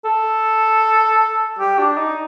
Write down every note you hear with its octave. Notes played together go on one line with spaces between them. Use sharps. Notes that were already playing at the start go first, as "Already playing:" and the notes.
A4
G4
D4
D#4